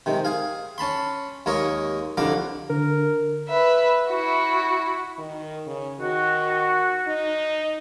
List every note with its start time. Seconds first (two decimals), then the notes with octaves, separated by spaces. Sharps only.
0.06 C3 D#3 G#3
0.25 G#4 F5
0.78 C#4 A5 B5 C6
1.46 D#2 G#3 A#3 A#4 C#5 D#5
2.17 C2 F2 D3 F5 A#5 D6
2.70 D3 A#4
3.48 B4 E5
4.08 E4 F#4
5.18 D#3
5.67 C#3
6.00 D#3 F#4
7.08 D#4